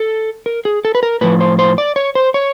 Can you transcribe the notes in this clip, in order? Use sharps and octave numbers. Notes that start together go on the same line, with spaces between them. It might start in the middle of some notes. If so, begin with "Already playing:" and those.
Already playing: A4
A#4
G#4
A4
B4
A#4
A2 F3 B4
C5
C5
D5
C#5
C5
C#5